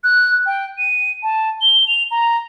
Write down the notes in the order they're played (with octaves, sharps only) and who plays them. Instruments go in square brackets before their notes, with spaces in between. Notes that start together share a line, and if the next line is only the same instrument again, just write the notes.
[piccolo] F#6
G5
D#7
A5
G7
F7
A#5